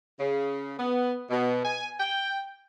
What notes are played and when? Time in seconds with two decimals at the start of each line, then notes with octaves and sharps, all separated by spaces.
0.20 C#3
0.79 B3
1.30 B2
1.64 G#5
1.99 G5